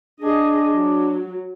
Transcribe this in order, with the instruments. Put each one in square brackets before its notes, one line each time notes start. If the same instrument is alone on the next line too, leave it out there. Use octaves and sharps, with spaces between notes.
[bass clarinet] D4 [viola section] G#4 D#5
[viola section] F#3